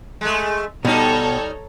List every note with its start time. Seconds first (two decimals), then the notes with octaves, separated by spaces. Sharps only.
0.21 G#3 A3
0.85 B2 G3 D#4 A4 C#5 A#5